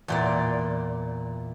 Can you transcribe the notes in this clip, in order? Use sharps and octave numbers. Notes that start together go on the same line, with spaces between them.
E2 A#2 D5